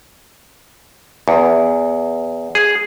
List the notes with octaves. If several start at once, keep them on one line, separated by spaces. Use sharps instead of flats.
E2
G#4